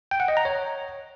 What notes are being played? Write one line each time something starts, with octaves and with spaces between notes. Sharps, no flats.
G5
F#5
D#5
A#5
C#5